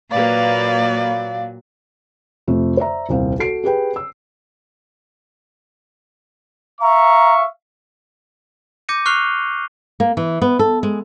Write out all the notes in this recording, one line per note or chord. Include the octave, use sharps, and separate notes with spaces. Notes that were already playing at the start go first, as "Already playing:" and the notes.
A#2 F#3 A#3 B4 D5 F5 G5
F2 C3 A3
C5 D5 E5 A#5
D#1 C2 C4 F5
F#4 A4 C7 D7
G4 G#4 B4 G5
E6
E5 F5 A#5 C#6
D6 G6 A#6 C#7 D#7
C#6 F6 F#6 C7 F7 G7
A#3
E3
B3
A4
G#3